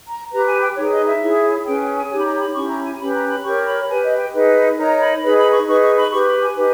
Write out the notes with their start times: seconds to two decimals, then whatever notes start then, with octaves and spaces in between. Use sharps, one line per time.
0.10 A#5
0.31 G4 B4 A#5
0.47 G#5
0.61 G5
0.76 D#4 G#4 B4 C#5
0.91 D#5
1.06 E5
1.21 E4 G#4 C#5
1.66 C#4 G#4 B4 G5
1.80 G5
1.95 G#5
2.10 D#4 G4 C#5 G#5
2.20 B5
2.25 A#5
2.40 B5
2.55 C#4 E4 G4 C#6
2.69 A#5
2.85 G#5
3.00 C#4 G4 B4 B5
3.14 A#5
3.30 B5
3.44 G4 A#4 C#5 C#6
3.66 B5
3.89 G4 B4 G#5
4.04 D#5
4.18 G5
4.33 D#4 G#4 B4
4.78 D#4 A#4 C#5 A#5
5.01 B5
5.23 D#4 G#4 B4 B5
5.38 B5
5.53 C#6
5.67 D#4 G#4 B4 C#6
5.82 C#6
5.97 B5
6.11 G4 B4 C#6
6.22 C#6
6.27 B5
6.42 G#5
6.56 D#4 G4 B4